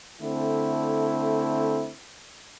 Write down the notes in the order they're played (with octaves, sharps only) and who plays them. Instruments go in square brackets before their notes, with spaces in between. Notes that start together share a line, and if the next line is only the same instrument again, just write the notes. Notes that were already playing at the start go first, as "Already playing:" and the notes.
[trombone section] D3 A3 C4 E4